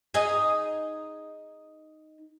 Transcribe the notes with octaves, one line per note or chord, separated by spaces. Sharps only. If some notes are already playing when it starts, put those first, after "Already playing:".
D#4 G#4 D#5